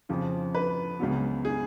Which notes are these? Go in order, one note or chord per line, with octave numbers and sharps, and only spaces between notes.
F2 C#3 F3
B4
C#2 C#3 F#3 B3
G#4